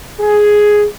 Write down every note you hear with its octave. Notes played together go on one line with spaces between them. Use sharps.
G#4